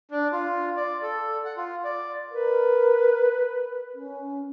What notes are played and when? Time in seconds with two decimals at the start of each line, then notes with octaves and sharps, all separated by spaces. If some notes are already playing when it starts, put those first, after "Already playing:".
0.11 D4
0.32 F4
0.77 D5
1.03 A4
1.45 F#5
1.57 F4
1.84 D5
2.31 A#4 B4
3.95 C#4